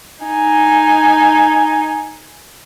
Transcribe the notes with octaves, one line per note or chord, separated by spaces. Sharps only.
D#4 G#5